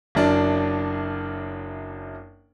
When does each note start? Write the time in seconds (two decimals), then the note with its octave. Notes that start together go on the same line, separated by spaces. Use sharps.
0.15 F#1 F#2 D4 D5